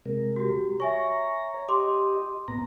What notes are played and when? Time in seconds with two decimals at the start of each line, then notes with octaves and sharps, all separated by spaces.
0.06 C3 G#3 A#4
0.36 F#4 G4
0.80 C#5 E5 G#5 A#5 C#6
1.68 G4 D#5 C6 D6
2.48 A2 B3 A#5